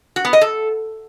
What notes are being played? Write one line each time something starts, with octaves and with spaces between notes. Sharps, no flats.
F#4
B3
D#5
A4